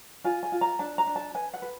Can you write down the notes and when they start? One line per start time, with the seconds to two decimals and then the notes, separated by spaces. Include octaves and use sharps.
0.24 F4 G#5
0.43 G#5
0.52 F4
0.61 A#5
0.79 D4 A5
0.98 A#5
1.07 D4
1.16 A5
1.35 B4 G#5
1.54 F#5
1.62 B4